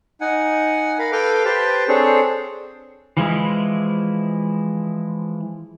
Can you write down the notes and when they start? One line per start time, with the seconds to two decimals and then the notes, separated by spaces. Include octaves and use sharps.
0.21 D#4 F#5 G#5
0.99 A#4 F5 B5
1.12 A4 B4 F5 G5 D6 F6
1.45 G4 B4 C5 G5 A5
1.88 C4 D4 G#4 A4 C5 C#5
3.17 E3 F3 G#3 E4